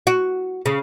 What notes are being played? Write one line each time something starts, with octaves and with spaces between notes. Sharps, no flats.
F#4
C#3